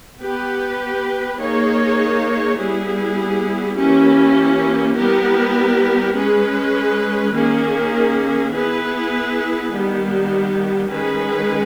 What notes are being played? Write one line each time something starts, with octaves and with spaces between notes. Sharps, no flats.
B3 G4 B4
A#3 D#4 G#4 C#5
G3 B3 E4 G#4
E3 A#3 C#4 E4 G4
G3 B3 E4 G4 A#4
G#3 C#4 G#4 B4
D#3 A#3 C#4 G#4
B3 E4 G#4 B4
D#3 G3 B3
D#3 G#3 C#4 G#4 B4